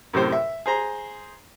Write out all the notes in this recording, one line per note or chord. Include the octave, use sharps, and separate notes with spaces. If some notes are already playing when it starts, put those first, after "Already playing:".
F#2 A2 C3 C5
E5
G#4 C5 A#5